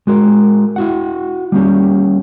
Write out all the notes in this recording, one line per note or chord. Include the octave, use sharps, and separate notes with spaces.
G#3 F#4 A#4
E4 F#4 F#5
G3 A#3 C#4 G4